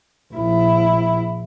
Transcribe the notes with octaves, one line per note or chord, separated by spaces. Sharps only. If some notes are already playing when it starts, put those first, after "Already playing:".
A#1 E4